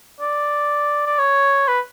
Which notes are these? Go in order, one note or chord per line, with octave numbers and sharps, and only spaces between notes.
D5
D5
C#5
B4